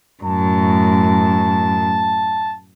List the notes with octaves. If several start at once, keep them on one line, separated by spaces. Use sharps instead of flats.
F#2 A2 A5